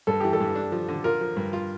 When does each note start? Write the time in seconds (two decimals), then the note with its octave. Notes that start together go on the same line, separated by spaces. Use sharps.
0.07 G2 A4
0.20 E3 G4
0.33 A4
0.40 G2
0.55 D4
0.72 F3
0.88 D3
1.04 F4 A#4
1.21 F3
1.37 G2
1.53 F4